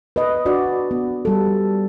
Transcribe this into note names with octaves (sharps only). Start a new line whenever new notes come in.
B4 D#5
D4 F#4 D5
B3
G3 A4